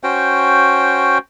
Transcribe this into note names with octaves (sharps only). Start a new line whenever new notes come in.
C#4 F#4 C5 G5